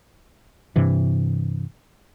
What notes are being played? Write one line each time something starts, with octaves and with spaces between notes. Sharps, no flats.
G2 C3 E3